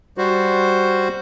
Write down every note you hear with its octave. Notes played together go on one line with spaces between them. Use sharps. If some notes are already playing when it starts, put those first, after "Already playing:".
G3 F#4 C5